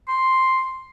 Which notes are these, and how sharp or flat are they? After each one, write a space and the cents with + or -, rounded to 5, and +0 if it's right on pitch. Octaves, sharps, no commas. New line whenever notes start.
C6 +5